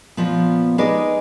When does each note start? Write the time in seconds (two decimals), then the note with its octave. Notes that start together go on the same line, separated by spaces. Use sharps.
0.17 A#2 F3 B3
0.78 G#3 D#4 G#4 B4 D5